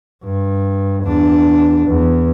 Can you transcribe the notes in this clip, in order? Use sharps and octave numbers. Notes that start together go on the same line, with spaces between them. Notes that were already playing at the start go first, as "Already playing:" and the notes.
G2
E2 D4
E2